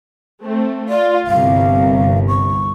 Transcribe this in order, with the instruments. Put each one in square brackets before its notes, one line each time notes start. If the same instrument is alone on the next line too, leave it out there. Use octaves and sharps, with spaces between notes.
[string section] A3 C4
[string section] F4 [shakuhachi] D5
[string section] G1 C2 [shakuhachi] F5
[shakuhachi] C#6